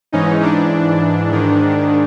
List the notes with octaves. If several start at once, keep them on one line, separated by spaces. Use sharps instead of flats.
G#2 E3 C#4 D#4
D4
G#2 D#3